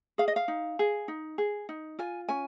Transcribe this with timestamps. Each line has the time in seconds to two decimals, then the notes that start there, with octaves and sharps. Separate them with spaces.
0.18 G#4 F5
0.28 D#5
0.36 F5
0.48 D#4
0.79 G#4
1.08 D#4
1.38 G#4
1.69 D#4
1.99 F4 G#5
2.29 C#4 G#5